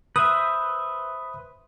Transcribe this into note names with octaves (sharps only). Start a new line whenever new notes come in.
B4 C5 E5 D#6